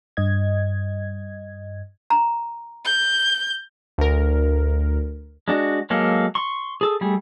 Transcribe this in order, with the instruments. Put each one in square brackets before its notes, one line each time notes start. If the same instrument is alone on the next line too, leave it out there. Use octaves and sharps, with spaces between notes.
[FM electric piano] G2 D#5 G#6
[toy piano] A#5
[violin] G6
[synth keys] D2 A#4
[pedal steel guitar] G#3 D4 F#4
F#3 G#3 A#3 A4 F5
C6 C#6
G#4 A4
G3 A3 G#4